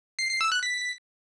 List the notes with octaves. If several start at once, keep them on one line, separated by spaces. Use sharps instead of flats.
C7
C7
E6
F#6
B6